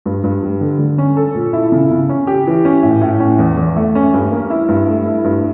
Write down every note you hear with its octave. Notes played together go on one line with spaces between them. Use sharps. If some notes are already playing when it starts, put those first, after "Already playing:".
G2
G2
G3
D3
D3
C#4
A4
A#2
E4
C#3
C#3
C#4
G4
E3
C#4
A2
A2
C#4
E2
E2
A3
C#4
G2
A#3
E4
G2
A3
E4
G2